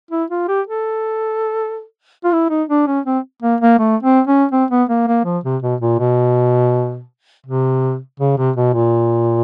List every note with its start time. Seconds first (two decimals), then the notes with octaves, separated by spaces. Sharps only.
0.11 E4
0.31 F4
0.48 G4
0.67 A4
2.24 F4
2.32 E4
2.50 D#4
2.69 D4
2.87 C#4
3.06 C4
3.43 A#3
3.61 A#3
3.79 A3
4.03 C4
4.28 C#4
4.52 C4
4.71 B3
4.89 A#3
5.08 A#3
5.25 F3
5.44 C3
5.63 B2
5.81 A#2
5.99 B2
7.47 C3
8.20 C#3
8.38 C3
8.56 B2
8.74 A#2